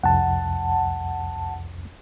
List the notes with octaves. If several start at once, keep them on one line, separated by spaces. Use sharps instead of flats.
C2 F2 F#5 A5